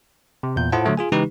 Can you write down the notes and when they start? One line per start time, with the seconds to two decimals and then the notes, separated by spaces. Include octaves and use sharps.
0.43 C3
0.56 E2 A#2 G6
0.72 A2 A3 F4 C5 F#5 A5
0.86 D3 F#3 A3
0.97 F4 G#4 G#5
1.12 C#3 E3 G#3 D#4 G4 B4